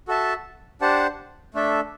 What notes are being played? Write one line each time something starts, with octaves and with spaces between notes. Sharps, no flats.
F#4 A4 E5 A5
D4 G4 C5 F#5 A5
A3 D4 A4 E5